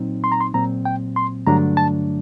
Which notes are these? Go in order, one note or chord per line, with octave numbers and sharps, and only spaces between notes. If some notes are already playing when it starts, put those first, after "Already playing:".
Already playing: A#2 F#3 C4 D#4
C6
A#5
C6
A#2 F#3 C4 A#5
G5
C6
G2 D3 F#3 A3 D4 A#5
A5